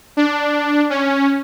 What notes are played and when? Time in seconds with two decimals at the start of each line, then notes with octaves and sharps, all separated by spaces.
0.17 D4
0.90 C#4